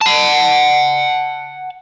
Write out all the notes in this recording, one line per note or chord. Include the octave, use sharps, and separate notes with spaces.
F#5 A5